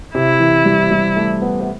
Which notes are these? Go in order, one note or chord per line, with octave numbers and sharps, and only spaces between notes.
C3 E4
E3
G3
G3
A3
B3
B3